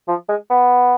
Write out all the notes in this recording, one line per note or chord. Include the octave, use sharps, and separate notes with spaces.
F3
G#3
B3